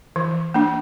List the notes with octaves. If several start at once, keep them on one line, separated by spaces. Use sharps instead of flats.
E3
A#3 D4